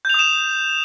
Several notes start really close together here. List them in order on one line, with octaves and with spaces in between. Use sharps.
G6 F7 D#6 E7